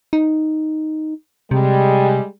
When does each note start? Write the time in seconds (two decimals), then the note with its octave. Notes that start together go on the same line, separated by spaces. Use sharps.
0.13 D#4
1.51 C3 G3 G#3